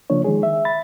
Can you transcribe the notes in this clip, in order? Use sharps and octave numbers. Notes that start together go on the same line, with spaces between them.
C#3 F3 A#3 D4 C#5
D#3 G#3 G#4
E5
B5 A6